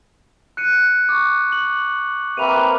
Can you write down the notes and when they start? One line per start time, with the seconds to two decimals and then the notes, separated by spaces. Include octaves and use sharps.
0.57 F#6 C#7 D#7
1.09 C#6 D6
1.52 F#7
2.37 C3 A#3 B4 D#7 F7